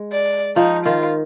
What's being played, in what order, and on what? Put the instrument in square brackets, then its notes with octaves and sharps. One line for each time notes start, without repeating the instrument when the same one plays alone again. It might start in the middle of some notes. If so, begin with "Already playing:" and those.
Already playing: [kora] G#3
[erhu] D5
[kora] F3 [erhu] D#4
[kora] D#3 [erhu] F4